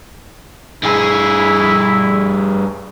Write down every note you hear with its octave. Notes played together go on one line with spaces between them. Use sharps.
G2 E4 G#4